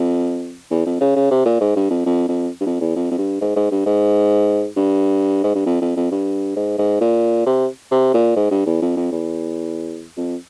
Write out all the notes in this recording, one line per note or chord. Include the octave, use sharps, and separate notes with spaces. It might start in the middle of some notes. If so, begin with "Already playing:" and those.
Already playing: F2
E2
F2
C#3
C#3
C3
A#2
G#2
G2
F2
F2
F2
G2
F2
E2
F2
F2
G2
G#2
G#2
G2
G#2
G2
G#2
G2
F2
F2
F2
G2
G#2
G#2
A#2
C3
C3
A#2
G#2
G2
E2
F2
F2
E2
F2